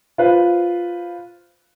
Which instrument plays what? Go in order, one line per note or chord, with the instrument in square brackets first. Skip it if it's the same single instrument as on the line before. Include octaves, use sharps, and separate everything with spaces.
[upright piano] F4 B4 C5